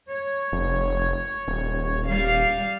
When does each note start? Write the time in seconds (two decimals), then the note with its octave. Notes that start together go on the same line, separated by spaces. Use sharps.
0.10 C#5
0.52 F1
1.48 D#1
2.08 G3 F5